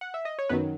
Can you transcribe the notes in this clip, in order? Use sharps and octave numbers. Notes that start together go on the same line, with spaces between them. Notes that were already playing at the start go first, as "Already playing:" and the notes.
F#5
E5
D#5
C#5
F#2 D#3 F#3 B3 B4